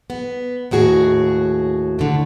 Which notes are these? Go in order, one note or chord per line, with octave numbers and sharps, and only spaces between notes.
B3
D#2 A2 F#4 G#4
D3 A3